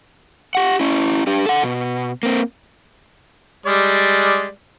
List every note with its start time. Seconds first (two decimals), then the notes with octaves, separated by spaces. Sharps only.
0.55 G4 F#5
0.80 C#4 E4
1.27 D4 G4
1.46 A4 F#5
1.63 B2
2.23 A#3 C4
3.66 G3 G#3 D5